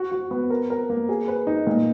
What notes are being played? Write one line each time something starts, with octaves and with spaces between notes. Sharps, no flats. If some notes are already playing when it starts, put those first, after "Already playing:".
Already playing: F#4
F#4
B3
A#4
A#4
A#3
G#4
B4
D#4
A#2